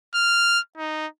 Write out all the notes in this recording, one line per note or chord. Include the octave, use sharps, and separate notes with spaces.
F6
D#4